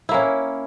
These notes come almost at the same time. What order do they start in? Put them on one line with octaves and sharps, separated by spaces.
E4 A#3 C#4